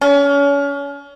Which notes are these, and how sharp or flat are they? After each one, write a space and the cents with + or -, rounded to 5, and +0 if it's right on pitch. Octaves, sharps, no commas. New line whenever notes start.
C#4 +35